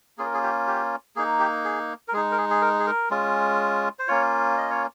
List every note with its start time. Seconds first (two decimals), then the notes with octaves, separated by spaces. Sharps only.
0.18 A#3 C#4 F4 G#4
0.26 A#4
0.34 G#4
0.43 G4
0.67 G4
1.16 A#3 D#4 G#4
1.40 G4
1.64 G#4
2.08 A#4
2.13 G#3 G#4
2.17 D#4
2.31 A#4
2.38 G#4
2.51 G#4
2.62 A#4
2.79 G#4
2.87 A#4
3.11 G#3 C#4 F4
3.99 C5
4.08 A#3 C#4 F4 C#5
4.58 D#5
4.70 C#5